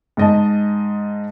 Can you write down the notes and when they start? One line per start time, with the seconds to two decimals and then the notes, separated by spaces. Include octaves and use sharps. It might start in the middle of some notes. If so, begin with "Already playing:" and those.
0.17 G#2 D#5 A5